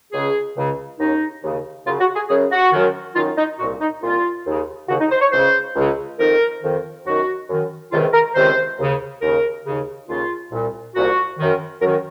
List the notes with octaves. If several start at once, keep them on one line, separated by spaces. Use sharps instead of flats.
C#2 C#3 G#4
C#2 C#3
D#2 C#3 D#4
D#2 C#3
F#2 C#3 F4
F#4
G#4
F#2 C#3 G#4
F#4
F#2 D#3
F#2 D#3 F4
D#4
C2 A#2 F#4
D#4
C2 A#2 F4
D#2 C#3
D#2 C#3 F#4
D#4
C5
C#5
C#2 C#3 C5
C#2 C#3
F2 D#3 A#4
F2 D#3
F#2 D#3 F#4
F#2 D#3
C#2 C3 D#3 F4
A#4
C#2 C3 D#3 C5
D#2 C#3
D#2 C#3 A#4
D#2 C#3
D#2 C#3 F4
C2 A#2
C2 A#2 F#4
F#2 D#3
F#2 D#3 A#4